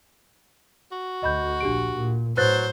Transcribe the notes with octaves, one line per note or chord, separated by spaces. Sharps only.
F#4
D2 D#5 B5 G6
A#1 D4 G4 D7
A#2
A2 F#3 B4 C5 F#6 A6